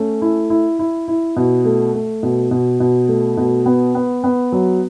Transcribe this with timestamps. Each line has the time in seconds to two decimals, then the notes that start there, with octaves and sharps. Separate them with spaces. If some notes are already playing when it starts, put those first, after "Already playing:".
Already playing: A3 C#4
0.22 E4
0.50 E4
0.79 E4
1.08 E4
1.36 B2
1.65 A3
1.94 A3
2.23 B2
2.51 B2
2.80 B2
3.08 A3
3.37 B2
3.66 B3
3.95 B3
4.24 B3
4.52 F#3